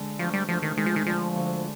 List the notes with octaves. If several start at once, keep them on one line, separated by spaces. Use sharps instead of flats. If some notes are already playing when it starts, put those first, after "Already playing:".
Already playing: D3 G#3
D2 F3
G3
D2 F3
D#3
D#3 G#3
F3
D#3
D3 F3
D2